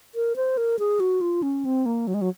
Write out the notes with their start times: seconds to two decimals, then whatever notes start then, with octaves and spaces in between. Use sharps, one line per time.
0.15 A#4
0.36 C5
0.57 A#4
0.79 G#4
1.00 F#4
1.21 F4
1.43 C#4
1.65 C4
1.86 A#3
2.07 F#3
2.14 G#3
2.21 F#3